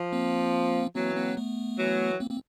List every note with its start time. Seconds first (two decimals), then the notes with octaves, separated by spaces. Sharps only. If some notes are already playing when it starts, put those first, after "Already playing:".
Already playing: F3
0.12 A#3 C4
0.95 E3 F#3 A#3 C4
1.16 A#3 C4
1.37 A3 B3
1.78 E3 F#3
2.20 A#3 C4
2.30 A#3 C4